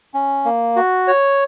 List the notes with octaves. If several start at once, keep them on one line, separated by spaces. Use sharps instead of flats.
C#4
A#3
F#4
C#5